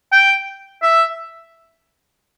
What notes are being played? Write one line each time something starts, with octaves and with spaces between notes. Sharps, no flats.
G5
E5